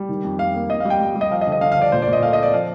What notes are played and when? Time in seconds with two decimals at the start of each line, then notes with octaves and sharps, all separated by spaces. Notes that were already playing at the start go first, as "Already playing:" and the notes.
Already playing: G3
0.09 D#3
0.24 F2
0.39 F2 F5
0.54 A#3
0.69 F2 D#5
0.80 G3 F5
0.90 G5
1.00 G3
1.15 G3
1.21 D#5
1.31 F3 F5
1.41 D#5
1.47 D3
1.52 D#5
1.61 D3 F5
1.72 F5
1.77 F3 D5
1.92 A#2 C5
2.02 D5
2.08 A#2 D#5
2.23 A3 F5
2.33 D#5
2.39 C4 D5
2.53 F3 F5